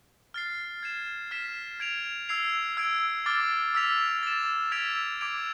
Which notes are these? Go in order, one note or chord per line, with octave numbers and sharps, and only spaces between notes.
F6 A6 C7
G#6 C7 E7
F6 B6 E7
G#6 D7 F7
E6 G#6 C7 F7
E6 G#6 D7
D6 F6 A6
E6 B6 F7
A6 E7
E6 G#6 B6 D7 F7
D6 G#6 D7 F7